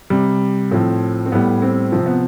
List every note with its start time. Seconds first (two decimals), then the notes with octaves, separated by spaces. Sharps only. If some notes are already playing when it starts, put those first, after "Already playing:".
0.10 C3 G3
0.71 A2 F3 C4
1.26 C4
1.32 A2 G3 B3
1.62 C4
1.92 C3 F3 C4
2.06 B3